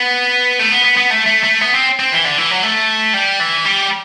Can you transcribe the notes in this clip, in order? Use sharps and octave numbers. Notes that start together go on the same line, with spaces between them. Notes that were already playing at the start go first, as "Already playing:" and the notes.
Already playing: B3
A3
B3
B3
B3
A3
A3
A3
B3
C4
C4
E3
D3
E3
F#3
A3
G3
E3
G3